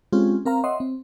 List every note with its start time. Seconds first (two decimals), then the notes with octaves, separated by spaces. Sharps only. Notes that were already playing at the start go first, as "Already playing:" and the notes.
0.12 G#3 C4 C#4 F4 G4 G#4
0.45 C4 A#4 F5 A#5
0.64 C#5 D#5 E5 F#5 C6
0.80 C4